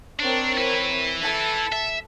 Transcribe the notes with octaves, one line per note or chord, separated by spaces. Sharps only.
C4 D4 A#4 C#5
E4 B4
A4
E5